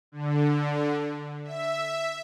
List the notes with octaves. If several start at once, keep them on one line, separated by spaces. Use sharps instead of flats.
D3
E5